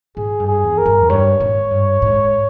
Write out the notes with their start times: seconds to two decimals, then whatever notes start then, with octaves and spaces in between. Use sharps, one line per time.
0.17 G#2 G#4
0.40 G2
0.48 G#4
0.64 E2
0.78 A#4
0.86 G2
1.00 E2
1.10 G2 C#5
1.40 G#2
1.71 G2
2.02 G#2